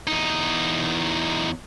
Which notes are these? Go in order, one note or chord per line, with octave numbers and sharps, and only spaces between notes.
E2 D#4